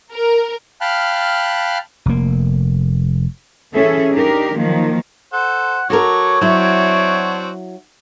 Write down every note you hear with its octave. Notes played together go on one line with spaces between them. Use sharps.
A#4
F5 G5 A5 B5 F6 F#6
F1 A#3
E3 C#4 G#4 A4 E5
D4 D#4 G4 A#4
D#3 F3 F#3 A#3
A4 C5 F#5
F#3 F#4 A4 A#4 C#5 C#6 D6
F#3 C4 D4 E4 F#4